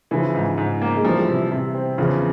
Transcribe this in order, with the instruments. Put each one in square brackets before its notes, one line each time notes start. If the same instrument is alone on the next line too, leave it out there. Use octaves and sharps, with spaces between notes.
[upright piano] C#3 F3 [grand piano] E3
[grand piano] G#2
G#2
A#3
[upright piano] G#3
[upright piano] E3 G3 [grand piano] F3
[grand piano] C3
C3
C4
[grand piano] E2 [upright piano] C#3 F3